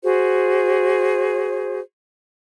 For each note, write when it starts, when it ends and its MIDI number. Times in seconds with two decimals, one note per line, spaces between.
0.03 1.79 66
0.03 1.79 68
0.03 1.79 72